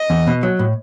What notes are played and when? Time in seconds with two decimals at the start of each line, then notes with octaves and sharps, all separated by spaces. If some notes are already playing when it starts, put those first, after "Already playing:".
Already playing: D#5
0.10 E2
0.27 B2
0.43 F#3
0.59 A2